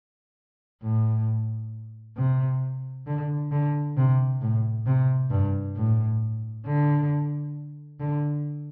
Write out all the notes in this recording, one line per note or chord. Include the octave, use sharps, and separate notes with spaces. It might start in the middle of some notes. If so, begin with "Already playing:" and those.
A2
C3
D3
D3
C3
A2
C3
G2
A2
D3
D3